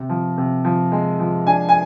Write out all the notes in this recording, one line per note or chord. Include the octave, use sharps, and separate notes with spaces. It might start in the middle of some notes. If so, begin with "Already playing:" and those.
Already playing: C3
F3
C3
F3
G#3
F3
D4 G#5
G#5